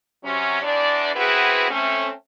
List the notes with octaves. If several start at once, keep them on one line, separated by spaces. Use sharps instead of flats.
C3 F#3 C#4
E2 D4 D5
B3 C4 E4 F#4 G#4 B4
A3 C4 C#4